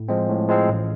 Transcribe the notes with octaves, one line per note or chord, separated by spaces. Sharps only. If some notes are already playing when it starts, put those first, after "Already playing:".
Already playing: A2
F3 G#3 C4
A2
F3 G#3 C4
A1